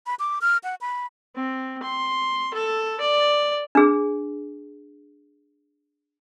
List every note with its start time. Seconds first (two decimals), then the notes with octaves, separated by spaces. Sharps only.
0.06 B5
0.19 D6
0.42 F6
0.64 F#5
0.81 B5
1.35 C4
1.83 C6
2.54 A4
3.01 D5
3.75 D4 G#4